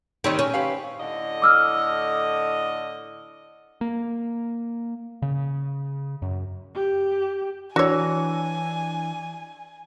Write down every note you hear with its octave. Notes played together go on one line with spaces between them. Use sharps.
D#3 G3 C4 D#4 C#5
C#4
G4 B4 F5
A2 D3 D#5
D6 E6 F6
A#3
C#3
F#2
G4
E3 D4 F#4 C#5 G#5 A#6